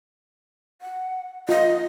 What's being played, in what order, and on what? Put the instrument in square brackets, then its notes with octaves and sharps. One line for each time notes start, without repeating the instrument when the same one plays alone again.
[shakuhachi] F#5
[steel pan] F4 [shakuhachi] D#5